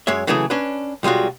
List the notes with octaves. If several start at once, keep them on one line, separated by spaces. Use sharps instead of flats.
F#2 G#3 C#5 E5
C#3 E3 F#3 A3 G#4
C#4 D4 B4
B1 G3 G#3 F4 F#4